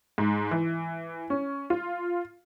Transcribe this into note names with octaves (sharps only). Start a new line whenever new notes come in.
G#2
E3
C#4
F4